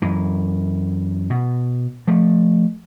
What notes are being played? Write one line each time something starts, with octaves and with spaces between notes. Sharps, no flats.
F#2 E3
B2
F3 A3